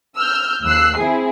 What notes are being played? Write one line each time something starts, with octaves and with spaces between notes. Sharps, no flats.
E6 F6 G6
D#2 E6 F#6 C7
C4 E4 G#4